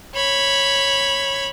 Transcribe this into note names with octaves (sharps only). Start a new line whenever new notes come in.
C#5 B5